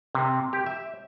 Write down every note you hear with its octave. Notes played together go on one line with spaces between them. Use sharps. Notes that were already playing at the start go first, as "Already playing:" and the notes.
C3
G4
E5